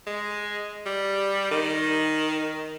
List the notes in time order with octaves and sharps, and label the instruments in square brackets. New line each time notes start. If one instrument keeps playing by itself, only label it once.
[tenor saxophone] G#3
G3
D#3